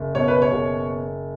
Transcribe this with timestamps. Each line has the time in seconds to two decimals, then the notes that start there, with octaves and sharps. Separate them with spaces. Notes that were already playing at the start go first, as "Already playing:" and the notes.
Already playing: F#1
0.15 B2 C#5
0.28 B4
0.42 C#5
0.52 F#1